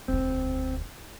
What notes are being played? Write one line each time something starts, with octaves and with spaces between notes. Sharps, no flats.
E1 D2 C4